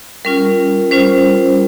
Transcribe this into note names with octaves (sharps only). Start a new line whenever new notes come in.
G3 C#4 F4 A#4
G3 C#4 F4 C5